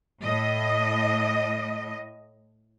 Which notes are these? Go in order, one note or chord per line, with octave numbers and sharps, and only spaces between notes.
A2 D#5